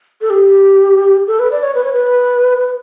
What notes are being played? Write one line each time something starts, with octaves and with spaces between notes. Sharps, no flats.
A4
G4
A4
B4
D5
C#5
B4
C#5
B4